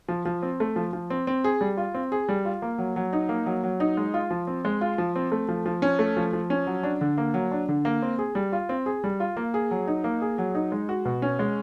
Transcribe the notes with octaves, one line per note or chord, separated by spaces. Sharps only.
F3
F3
C4
A3
F3
F3
C4
C4
G#4
G3
F4
C4
G#4
G3
F4
A#3
F#3
F#3
D#4
A#3
F#3
F#3
D#4
G#3
F4
F3
C4
G#3
F4
F3
C4
A3
F3
F3
C#4
A3
F3
F3
C#4
F#3
D4
D3
A#3
F#3
D4
D3
A#3
C4
G#4
G3
F4
C4
G#4
G3
F4
A#3
G#4
F#3
D#4
A#3
G#4
F#3
D#4
G#3
F#4
B2
C#4
G#3